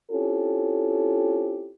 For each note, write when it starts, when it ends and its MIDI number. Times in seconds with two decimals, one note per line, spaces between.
0.11 1.71 60
0.11 1.71 61
0.11 1.71 64
0.11 1.71 65
0.11 1.71 67
0.11 1.71 69